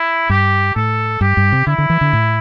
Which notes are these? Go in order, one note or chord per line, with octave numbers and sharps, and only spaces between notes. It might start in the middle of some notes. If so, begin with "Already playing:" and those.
Already playing: E4
G2 G4
A2 A4
G2 G4
G2
C3
D3 E4
D3
E3
D3
A2